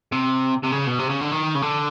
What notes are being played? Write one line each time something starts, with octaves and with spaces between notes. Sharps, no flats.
C3
C3
C#3
B2
C3
C#3
D3
D#3
C#3
D3